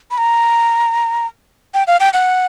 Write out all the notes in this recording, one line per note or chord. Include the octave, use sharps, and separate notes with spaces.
B5
A#5
G5
F5
G5
F#5